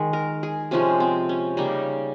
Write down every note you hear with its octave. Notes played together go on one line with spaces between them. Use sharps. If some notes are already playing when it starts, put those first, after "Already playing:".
Already playing: D#3 G#3
A#4
G#4
C3 F3 G#3 C#4
C4
C#4
C#3 G3 A#3 D#4